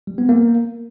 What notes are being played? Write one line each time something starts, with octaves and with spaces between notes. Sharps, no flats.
G3
B3
A#3